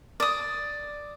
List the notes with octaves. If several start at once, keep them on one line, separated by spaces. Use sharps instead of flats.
D5 D#6